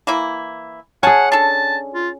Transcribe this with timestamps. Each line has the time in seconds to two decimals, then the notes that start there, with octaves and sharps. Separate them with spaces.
0.07 E3 A#3 E4
1.03 C#4 G#4 F#5 G#5 A5
1.32 D4 A4 A5
1.94 F4